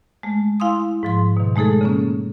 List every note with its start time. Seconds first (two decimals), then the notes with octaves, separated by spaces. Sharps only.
0.23 G#3 A3
0.60 E4 F5 G#5 C6 D#6
1.03 G#2 F3 C6
1.37 B2 D#3
1.56 G#3 A3 D#4 G#4 A4
1.81 C#3 A#3 C#4